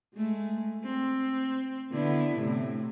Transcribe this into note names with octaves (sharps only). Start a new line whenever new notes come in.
G#3 A3
C4
D3 B3 E4
A2 C3 A3